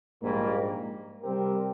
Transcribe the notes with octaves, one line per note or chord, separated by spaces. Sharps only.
A#1 G#2 G3 A#3
C3 G3 C4 G4 A#4